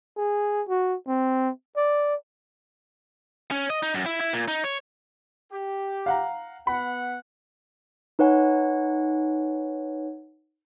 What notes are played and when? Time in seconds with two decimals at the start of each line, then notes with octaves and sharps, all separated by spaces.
0.17 G#4
0.68 F#4
1.07 C4
1.76 D5
3.51 C#4
3.70 D#5
3.83 D#4
3.94 F#2
4.06 E4
4.21 E4
4.33 A#2
4.48 D#4
4.64 C#5
5.52 G4
6.06 F5 F#5 A#5
6.67 B3 F#5 B5
8.19 D#4 B4 C#5 F#5 G#5